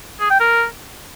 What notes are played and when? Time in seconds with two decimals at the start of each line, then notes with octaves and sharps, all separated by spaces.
0.20 G#4
0.30 G5
0.40 A#4